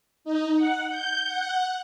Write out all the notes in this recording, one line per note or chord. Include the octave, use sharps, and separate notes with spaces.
D#4
F#5
G6
F#5